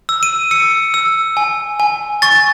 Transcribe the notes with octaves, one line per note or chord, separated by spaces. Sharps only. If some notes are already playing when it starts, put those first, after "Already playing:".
E6
D#7
E6 C#7
E6
G#5
G#5
C#6 A6